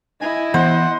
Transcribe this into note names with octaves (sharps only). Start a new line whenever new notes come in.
E4 D#5 G#5
E3 B3 C5 F#5